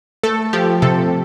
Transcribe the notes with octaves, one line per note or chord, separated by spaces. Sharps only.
A3 A4
F3 G4
C3 A4